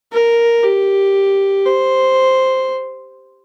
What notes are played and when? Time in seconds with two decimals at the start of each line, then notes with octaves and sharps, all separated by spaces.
0.12 A#4
0.63 G4
1.65 C5